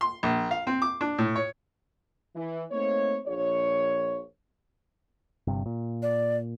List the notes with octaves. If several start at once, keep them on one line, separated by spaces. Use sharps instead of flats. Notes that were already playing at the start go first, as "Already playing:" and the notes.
C6
A#1
F5
C4
D6
D4
A2
C#5
E3
A3 A#3 C4 D#4 C#5
A#1 C#5
G1 G2 C3
A#2
D5